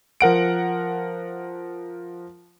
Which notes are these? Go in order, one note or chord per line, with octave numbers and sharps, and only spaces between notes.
F3 A#4 F#5 D7